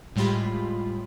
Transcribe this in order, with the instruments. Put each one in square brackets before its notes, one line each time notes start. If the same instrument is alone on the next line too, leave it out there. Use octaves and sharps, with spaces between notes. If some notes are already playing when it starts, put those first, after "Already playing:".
[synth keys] A2 G3 G#3 F4 G4 B5